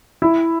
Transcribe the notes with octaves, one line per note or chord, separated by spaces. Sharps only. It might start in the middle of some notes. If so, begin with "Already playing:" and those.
E4